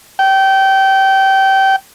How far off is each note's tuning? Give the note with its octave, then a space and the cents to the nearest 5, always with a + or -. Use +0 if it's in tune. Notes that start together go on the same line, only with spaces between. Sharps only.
G5 -25